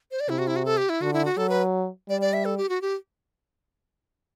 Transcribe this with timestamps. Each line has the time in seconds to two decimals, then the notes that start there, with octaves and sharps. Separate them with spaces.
0.11 C5
0.20 D5
0.29 C3 E4
0.39 F#4
0.47 E4
0.56 F#4
0.65 A4
0.77 G4
0.89 E4
1.01 D3 F#4
1.13 E4
1.25 F#4
1.37 F#3 A4
1.49 B4
2.09 G3 D5
2.21 D5
2.33 E5
2.45 A4
2.57 G4
2.69 F#4
2.82 G4